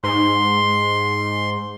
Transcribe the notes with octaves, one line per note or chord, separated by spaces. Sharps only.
G#2 C6